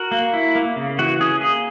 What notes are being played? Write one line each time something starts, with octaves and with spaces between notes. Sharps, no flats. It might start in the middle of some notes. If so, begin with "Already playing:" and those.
Already playing: F#4 A#4
A#3
E4
A#3
C#3
E3 F#4
C#4 G#4
A#3 G#4